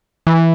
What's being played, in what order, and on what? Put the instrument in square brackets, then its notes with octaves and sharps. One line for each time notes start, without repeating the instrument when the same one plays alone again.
[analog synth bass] E3